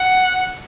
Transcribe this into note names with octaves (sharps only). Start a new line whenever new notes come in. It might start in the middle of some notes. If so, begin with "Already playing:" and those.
Already playing: F#5